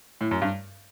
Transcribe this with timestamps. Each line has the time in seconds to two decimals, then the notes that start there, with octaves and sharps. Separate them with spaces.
0.21 A2
0.31 F#2
0.42 G2